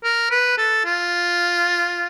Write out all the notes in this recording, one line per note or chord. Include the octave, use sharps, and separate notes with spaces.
A#4
B4
A4
F4